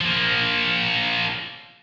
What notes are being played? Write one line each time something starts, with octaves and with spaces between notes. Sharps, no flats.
F3 A#3